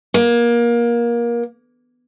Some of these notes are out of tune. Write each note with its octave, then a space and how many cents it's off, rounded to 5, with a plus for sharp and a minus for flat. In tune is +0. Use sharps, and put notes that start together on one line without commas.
A#3 +25